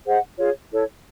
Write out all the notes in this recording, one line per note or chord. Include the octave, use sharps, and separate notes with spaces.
G#4 C5 D#5 F#5
F4 G#4 C#5
E4 A4 C#5